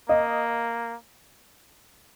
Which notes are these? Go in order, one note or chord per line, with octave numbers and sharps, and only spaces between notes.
A#3 D#5